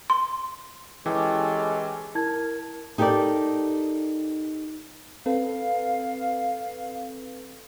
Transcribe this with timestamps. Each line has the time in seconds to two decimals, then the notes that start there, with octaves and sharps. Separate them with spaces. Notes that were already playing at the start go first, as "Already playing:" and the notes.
0.10 C6
1.06 E3 G#3 C#4 G4 A4
2.15 E4 A#4 A5 G#6
2.98 D#4 G4 A4 A#4 D5
5.26 C4 A4 B4 F5